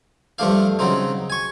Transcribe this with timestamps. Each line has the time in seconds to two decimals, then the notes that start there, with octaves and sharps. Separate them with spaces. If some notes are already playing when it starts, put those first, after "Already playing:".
0.39 G2 F3 A3 D4 F5
0.79 C#3 F#3 C4 D#4
1.30 G#5 C#6